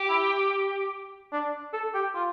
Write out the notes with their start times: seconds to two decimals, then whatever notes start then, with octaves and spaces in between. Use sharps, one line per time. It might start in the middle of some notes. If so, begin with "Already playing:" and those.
Already playing: G4
0.09 E4
1.33 D4
1.73 A4
1.95 G4
2.15 F4